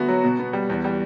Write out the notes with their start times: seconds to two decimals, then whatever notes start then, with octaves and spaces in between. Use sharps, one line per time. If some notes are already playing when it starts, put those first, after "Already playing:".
Already playing: D3 A3 B3 F#4
0.08 F#3
0.24 B2
0.39 B3
0.53 G3
0.70 E2
0.84 G3